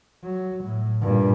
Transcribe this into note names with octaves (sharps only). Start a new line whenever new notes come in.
F#3
A2
G2 A#2